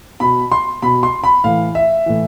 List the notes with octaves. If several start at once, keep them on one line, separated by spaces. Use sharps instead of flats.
B2 B5
C6
B2 B5
C6
B5
A2 E3 F5
E5
A2 E3